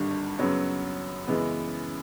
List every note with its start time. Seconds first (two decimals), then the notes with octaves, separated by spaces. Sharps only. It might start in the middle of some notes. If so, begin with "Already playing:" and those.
Already playing: G#1 G2 D3 G3
0.38 F#2 C#3 F#3 B3
1.27 F#2 C#3 E3 G#3 B3